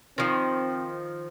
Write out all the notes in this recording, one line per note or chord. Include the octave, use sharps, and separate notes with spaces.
D#3 F3 C4